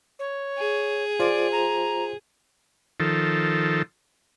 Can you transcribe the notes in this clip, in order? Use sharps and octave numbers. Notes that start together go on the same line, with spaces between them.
C#5
G#4
F4 C5 D5
A#5
D#3 F3 A4